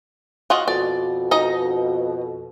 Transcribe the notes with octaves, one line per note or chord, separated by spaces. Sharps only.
F4 F#4 D#5
F2 B2 D5
D#4 D#5 A#5